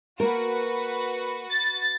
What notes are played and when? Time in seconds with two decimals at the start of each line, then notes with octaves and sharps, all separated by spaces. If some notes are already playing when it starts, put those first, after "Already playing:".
0.20 A#3 F#4 A#4 B4
1.50 A6